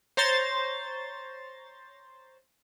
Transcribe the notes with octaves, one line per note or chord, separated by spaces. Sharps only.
C5 C#5 A#5 C6 A6